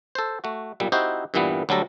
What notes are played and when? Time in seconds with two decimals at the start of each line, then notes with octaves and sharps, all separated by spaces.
0.15 A4 C5
0.44 A3 F#4
0.80 B1 A#2 G3
0.92 C4 D#4 E4 F#4 G4 C5
1.34 G2 A#2 E3 G3 B3
1.69 D2 F#3 G3 A4 A#5